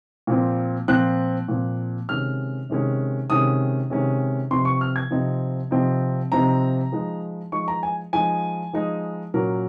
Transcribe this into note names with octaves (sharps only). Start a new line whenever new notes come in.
A#2 F3 C4
A#2 F3 C4 F#6
A#2 F3 C4
C3 D#3 G#3 C#4 F6
C3 D#3 G#3 C#4
C3 D#3 G#3 C#4 D#6
C3 D#3 G#3 C#4
C3 F3 C4 D#4 C6
C#6
F6
G#6
C3 F3 C4 D#4
C3 F3 C4 D#4
C3 F3 C4 D#4 A#5
F3 G#3 D#4
F3 G#3 D#4 C#6
A#5
G#5
F3 G#3 D#4 G#5
F3 G#3 D#4
A#2 F#3 A#3 C#4 A#4